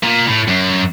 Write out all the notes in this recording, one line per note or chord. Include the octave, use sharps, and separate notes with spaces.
A#2
A2
F#2